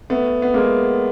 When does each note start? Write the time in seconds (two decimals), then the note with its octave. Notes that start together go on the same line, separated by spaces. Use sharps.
0.10 A3 B3
0.42 B3
0.54 G#3 A#3